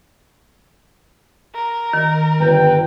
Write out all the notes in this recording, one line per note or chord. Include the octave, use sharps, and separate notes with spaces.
A#4
D#3
G1 B4 G5